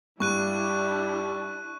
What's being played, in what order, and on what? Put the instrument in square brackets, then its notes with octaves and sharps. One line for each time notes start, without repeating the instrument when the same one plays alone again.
[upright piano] G2 [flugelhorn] G3 [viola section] D4 E4 [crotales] C#6 F#6 D#7